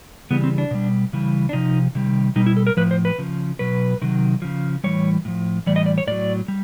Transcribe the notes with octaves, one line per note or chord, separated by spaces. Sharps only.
C#3 E3 G3 B3
C4
D4
B2 G3
C#3 E3 G3
D4
C3 F3 D#4
C3 D#3 G3
B2 G3 D#4
E4
A4
A#4
A2 F3 B4
C5
B4
C#3 F3
B2 F#3 B4
C3 D#3 F#3
C#3 F3
A2 E3 G3 C#5
A2 F3
A2 E3 G3 D5
D#5
D5
C#5
A2 F#3 D5
G3